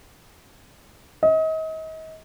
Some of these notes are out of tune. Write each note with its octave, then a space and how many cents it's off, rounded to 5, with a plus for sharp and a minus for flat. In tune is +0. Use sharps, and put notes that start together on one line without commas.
D#5 +35